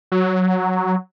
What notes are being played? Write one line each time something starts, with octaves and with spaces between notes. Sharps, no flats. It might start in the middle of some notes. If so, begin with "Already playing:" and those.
F#3